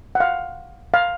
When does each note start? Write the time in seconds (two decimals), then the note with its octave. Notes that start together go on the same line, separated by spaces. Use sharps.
0.15 F#5
0.20 F5
0.94 F5